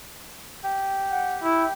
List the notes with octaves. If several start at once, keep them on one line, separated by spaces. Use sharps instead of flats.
G4 G5
F#5
E4